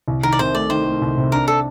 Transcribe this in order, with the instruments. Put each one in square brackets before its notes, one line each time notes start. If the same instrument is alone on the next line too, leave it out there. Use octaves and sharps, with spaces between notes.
[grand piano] C2
[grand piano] D#3 [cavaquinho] A#4
[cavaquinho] D5
[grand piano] C3 [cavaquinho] C5
[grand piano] A3 [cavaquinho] D5
[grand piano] D#3 [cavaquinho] C5
[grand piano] A3
C2
C3
[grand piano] D4 [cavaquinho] A#4
[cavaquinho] A4 [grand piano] D5